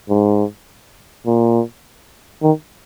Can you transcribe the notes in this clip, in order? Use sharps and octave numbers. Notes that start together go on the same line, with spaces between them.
G#2
A#2
D#3